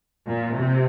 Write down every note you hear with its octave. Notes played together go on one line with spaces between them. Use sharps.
A#2
C3